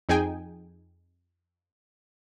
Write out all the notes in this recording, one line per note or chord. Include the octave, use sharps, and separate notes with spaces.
F2 D#4 G#4 G5 G#5